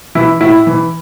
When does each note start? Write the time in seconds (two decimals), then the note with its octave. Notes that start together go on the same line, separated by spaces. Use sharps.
0.15 E3 E4
0.41 A2 E4
0.67 E3